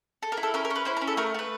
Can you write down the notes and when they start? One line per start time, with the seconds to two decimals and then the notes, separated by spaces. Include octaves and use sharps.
0.22 A4
0.32 A#4
0.37 E4
0.43 A4
0.54 C#4 A#4
0.65 A#4
0.70 C#4
0.75 B4
0.85 E4 C5
0.97 A#4
1.01 C#4
1.07 A4
1.17 A3 A#4
1.34 A3 B4